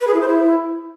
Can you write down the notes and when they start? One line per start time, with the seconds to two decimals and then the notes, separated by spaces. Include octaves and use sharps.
0.01 B4
0.07 G#4
0.14 E4
0.21 C5
0.28 E4